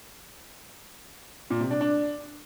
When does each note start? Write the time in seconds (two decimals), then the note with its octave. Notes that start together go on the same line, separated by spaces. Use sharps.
1.50 A#2
1.61 C3
1.71 D4
1.81 D4